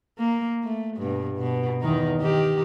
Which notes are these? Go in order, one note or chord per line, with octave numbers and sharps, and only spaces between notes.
A#3
A3
G2 B2
B2
E2 D#3 D#4
D#3 G4